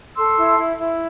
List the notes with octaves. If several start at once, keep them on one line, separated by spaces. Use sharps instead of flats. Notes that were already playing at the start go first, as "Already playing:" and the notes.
A4 C6 E6
E4
E4
E4